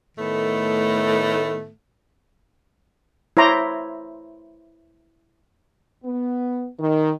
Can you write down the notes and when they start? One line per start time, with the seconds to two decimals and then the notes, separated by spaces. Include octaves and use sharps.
0.18 A2 D#3 A3 B3 A4
3.37 E4 C5 C#5 A#5 C6 D6
6.04 B3
6.79 D#3